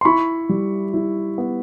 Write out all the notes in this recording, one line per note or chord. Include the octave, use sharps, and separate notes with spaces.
C6
E4 B5 C#6
G3
E4
B3